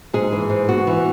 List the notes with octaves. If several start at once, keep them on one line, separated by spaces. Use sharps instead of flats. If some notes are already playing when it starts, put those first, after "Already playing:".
G#2 G#4
E3
G#2
B3 F#4
E3